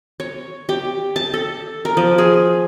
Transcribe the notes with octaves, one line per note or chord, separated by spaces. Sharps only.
C#5
G4
A5
A4
A#4
F3
G#4